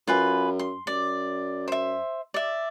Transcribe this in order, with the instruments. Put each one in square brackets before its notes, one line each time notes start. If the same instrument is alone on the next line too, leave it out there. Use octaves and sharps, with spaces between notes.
[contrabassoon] F#2 [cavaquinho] F4 B4 G#5
[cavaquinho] C6
[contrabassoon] F#2 [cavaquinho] D5
[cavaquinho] C5 E5
D5 E5